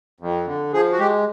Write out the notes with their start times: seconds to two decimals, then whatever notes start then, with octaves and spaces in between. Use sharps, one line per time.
0.20 F2
0.46 D3
0.73 F3 G#4
0.92 F#4
0.99 G#3 G4